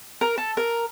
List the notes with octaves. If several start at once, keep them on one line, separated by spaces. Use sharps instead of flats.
A#4
A4
A#4